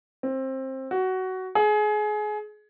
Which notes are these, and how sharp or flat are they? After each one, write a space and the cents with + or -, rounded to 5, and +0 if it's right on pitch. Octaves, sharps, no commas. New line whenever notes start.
C4 +20
F#4 +15
G#4 +25